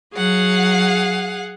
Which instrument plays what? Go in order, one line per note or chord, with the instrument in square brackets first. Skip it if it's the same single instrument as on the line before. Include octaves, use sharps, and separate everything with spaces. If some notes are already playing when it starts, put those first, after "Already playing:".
[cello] F#3 [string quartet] G#4 F5 F#5